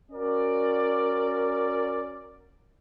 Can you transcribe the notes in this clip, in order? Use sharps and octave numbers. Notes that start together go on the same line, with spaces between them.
C#4 F#4 A#4 D5